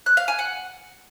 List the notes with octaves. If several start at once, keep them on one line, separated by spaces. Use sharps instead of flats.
F#6
F5
G#5
F#5